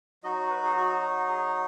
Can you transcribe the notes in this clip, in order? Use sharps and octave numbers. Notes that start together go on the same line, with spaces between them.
F#3 D#4 F#4 D#5
B4
G#4
F#4
G#4